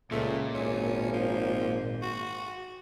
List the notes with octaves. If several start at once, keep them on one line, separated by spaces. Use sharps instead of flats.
C#2 A#2 A3
G#1 C#4
F3
F#4